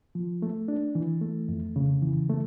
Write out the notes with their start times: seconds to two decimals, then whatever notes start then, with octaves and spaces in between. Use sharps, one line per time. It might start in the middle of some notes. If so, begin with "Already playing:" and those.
0.15 F3
0.42 A3
0.68 D4
0.95 E3
1.21 A3
1.49 F2
1.76 C#3
2.02 E3
2.29 A3